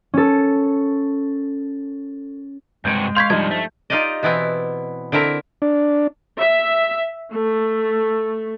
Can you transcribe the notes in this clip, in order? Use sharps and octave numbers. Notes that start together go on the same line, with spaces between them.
C#4 A4
G2 C3 G#3 F#4 G6 G#6 D7
F5 C6 C#6 G6 G#6 B6
G2 F3 G3 D#4 C5 G#6
A3
D#4 F4 G4 D5 D#5
B2 E3 B3 C4 E4
D3 C4 E4 A#4 E5
D4
E5
A3